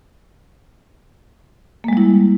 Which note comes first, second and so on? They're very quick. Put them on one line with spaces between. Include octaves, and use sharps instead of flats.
A#3 G#3 G3 E4